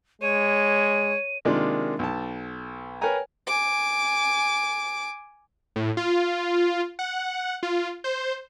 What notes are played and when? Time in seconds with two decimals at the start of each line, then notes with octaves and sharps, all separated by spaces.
0.22 G#3 C#5 D#7
1.45 C3 D#3 G#3 A#3 D4 F4
1.99 B1 A5
3.01 A#4 B4 C#5 G5 G#5 A#5
3.47 G#5 D6
5.76 A2
5.97 F4
6.99 F#5
7.63 F4
8.04 C5